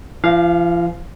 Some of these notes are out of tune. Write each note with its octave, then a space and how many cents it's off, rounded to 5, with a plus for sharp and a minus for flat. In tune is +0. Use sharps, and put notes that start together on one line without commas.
F3 -45 F5 +0